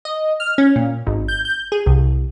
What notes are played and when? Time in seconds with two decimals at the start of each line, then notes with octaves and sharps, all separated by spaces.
0.05 D#5
0.40 F6
0.58 C#4
0.76 A#2
1.07 G#1
1.28 G6
1.45 G6
1.72 G#4
1.86 C2